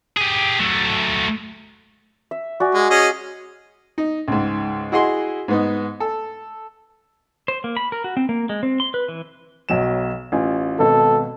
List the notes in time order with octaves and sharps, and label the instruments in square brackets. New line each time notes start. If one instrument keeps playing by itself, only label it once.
[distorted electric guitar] G4 G#4
F#3 A3
[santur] E5
F#4 D5 G#5
[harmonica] G#3
C#4 G#4 D#5
[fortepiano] D#4
C#2 G#2
E4 F#4 G#4 D#5 F#5 C6
G#2 B3 D#4
A4
[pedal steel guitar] C5
A#3
B5
A#4
F#4
C4
A#3
G#3
C4
C6
B4
E3
[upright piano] B1 F#3 E7
A1 F4 G#5
[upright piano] G#1 B2 [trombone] A4